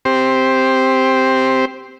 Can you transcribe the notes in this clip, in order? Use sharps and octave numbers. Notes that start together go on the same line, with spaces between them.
C4 G4 C5